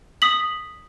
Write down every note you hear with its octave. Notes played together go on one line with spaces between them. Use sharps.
D#6 B6 F#7